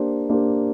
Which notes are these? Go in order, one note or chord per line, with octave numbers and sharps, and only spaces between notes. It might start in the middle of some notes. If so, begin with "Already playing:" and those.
Already playing: A#3 D4 G4 C5
A#3 D4 G4 C5